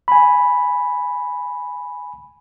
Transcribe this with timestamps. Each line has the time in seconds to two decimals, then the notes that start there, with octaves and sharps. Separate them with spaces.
0.08 G#5 B5